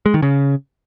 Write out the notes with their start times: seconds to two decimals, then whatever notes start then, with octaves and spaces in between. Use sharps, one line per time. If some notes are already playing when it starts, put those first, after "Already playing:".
0.06 G#3
0.14 D#3
0.22 C#3